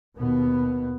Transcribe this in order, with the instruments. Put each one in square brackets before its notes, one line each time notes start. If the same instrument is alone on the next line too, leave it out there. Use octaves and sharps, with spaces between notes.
[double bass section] D#2 B2 B3